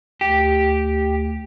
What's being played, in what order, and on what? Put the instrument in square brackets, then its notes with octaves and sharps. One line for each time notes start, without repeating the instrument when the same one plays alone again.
[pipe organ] D2 [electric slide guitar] G4